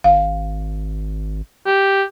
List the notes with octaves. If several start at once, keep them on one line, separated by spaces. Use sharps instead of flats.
G#1 F5
G4